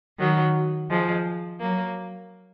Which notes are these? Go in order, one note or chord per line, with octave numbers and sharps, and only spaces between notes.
D#3 F#3
F3 G#3
F#3 A#3